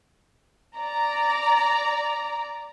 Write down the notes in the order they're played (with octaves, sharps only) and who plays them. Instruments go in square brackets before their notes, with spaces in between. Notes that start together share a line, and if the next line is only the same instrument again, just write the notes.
[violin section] D5 A#5